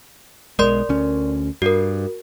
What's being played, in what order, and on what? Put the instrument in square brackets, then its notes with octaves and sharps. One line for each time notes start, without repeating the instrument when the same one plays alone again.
[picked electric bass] B1 E2 G#3 [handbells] A#4 D5 C6
[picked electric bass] D2 C#4
[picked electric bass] G2 [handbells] F#4 A#4